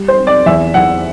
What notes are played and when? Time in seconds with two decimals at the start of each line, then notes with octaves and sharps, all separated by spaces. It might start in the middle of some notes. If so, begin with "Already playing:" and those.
Already playing: G3
0.08 C5
0.18 C4
0.27 D5
0.46 E2 E5
0.74 E2 F#5